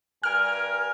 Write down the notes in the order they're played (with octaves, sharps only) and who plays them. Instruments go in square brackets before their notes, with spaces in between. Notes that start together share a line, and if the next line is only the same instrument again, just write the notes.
[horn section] G2 A#4 G#5 [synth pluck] F6